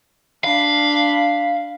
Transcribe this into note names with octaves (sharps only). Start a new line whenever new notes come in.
D4 F5 B5